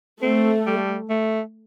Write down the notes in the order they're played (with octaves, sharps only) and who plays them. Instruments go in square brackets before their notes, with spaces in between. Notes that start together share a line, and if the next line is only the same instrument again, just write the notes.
[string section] A3 [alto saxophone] C4
[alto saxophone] G3
A3